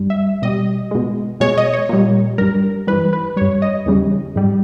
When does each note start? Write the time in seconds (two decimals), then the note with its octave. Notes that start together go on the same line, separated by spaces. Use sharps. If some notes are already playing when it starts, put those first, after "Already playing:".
Already playing: G2 G3
0.10 E5
0.42 B2 G3 D#5
0.91 B2 G#3
1.40 B2 G#3 C#5
1.58 D#5
1.74 C#5
1.89 A#2 G3
2.38 G2 G3 A#4
2.87 G2 E3 G3 B4
3.13 B4
3.36 G2 G3 C#5
3.62 D#5
3.86 E2 C#3 G3
4.36 G#2 G3